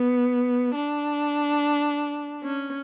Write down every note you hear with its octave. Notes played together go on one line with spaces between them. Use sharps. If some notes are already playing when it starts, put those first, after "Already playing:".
Already playing: B3
D4
C#4